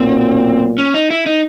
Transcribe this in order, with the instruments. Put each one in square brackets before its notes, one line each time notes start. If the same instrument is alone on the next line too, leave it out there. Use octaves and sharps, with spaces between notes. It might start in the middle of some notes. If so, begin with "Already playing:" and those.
Already playing: [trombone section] B1 A#2 F#3 B3 [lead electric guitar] C4
[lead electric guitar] C#4
D#4
E4
D#4